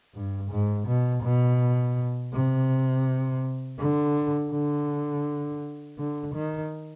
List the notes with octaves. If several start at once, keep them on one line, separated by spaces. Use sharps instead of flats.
G2
G#2
B2
B2
C3
D3
D3
D3
D#3